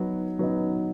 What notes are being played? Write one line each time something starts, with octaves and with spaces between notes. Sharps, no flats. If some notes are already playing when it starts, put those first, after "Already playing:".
Already playing: F#3 B3 D#4
F#3 B3 D#4